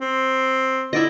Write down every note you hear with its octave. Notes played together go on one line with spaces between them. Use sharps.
C4
D3 E4 D5 D#5